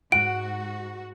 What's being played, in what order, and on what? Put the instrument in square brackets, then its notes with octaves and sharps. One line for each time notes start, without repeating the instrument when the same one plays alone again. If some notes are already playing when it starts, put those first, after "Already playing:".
[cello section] G#2 F#4 [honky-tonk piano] F#5 [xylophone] D7